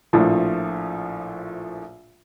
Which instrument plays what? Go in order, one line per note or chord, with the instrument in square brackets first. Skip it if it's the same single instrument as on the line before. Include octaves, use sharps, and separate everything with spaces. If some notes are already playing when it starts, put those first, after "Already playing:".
[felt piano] A#1 A2 F3